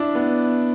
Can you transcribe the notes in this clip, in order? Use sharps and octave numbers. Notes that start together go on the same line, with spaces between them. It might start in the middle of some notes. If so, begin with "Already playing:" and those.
Already playing: D4 E4
B3